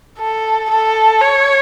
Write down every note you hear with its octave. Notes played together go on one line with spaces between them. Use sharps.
A4
A4
C#5